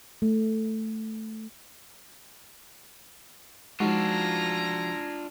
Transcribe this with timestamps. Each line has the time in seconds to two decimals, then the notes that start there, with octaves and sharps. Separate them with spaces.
0.22 A3
3.80 F3 G#3 D4 D#4 F4 F#4 G#4 A#5